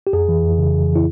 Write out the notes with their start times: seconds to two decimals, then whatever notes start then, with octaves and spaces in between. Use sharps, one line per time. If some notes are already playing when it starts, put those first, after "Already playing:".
0.07 G4
0.13 F2 G#4
0.29 E3
0.43 F2
0.58 C#3
0.74 F2
0.89 E3
0.96 E4